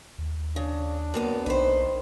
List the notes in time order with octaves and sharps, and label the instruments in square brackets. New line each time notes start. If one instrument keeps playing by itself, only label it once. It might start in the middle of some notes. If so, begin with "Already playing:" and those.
[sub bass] D#2
[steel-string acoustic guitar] C#3 [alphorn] D4
[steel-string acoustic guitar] F#2 A#3 B3
[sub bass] B1 [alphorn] D#3 [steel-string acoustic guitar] B4 C5